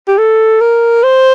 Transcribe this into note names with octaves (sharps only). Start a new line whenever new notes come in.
G4
A4
A#4
C5